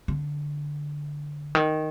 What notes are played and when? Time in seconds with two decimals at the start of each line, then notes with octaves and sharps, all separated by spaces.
0.08 D3
1.55 D#3